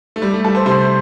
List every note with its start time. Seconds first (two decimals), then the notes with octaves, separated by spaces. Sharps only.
0.16 A3
0.22 G3
0.34 A3
0.44 G3 A4
0.55 C5
0.66 C3 C5